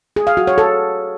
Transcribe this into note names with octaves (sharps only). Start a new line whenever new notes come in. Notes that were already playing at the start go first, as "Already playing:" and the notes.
G#4
F5
F#4
C#5
A4